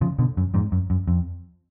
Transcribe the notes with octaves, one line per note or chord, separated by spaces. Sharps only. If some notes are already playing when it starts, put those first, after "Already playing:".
C#3 F3
B2 D3
F#2
F2 G#2
F#2
F#2
F2